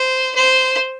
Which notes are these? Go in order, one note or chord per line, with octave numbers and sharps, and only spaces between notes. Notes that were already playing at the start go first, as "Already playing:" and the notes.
Already playing: C5
C5